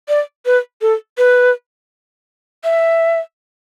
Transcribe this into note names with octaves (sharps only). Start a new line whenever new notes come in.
D5
B4
A4
B4
E5